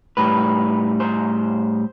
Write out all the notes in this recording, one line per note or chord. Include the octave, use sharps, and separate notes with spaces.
A2 G3 B4
C5